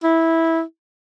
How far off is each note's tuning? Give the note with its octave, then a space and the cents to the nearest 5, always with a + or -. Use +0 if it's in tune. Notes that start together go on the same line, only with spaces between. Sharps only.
E4 -15